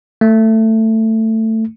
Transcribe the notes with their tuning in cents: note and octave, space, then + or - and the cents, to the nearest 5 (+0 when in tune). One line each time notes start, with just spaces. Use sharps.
A3 +15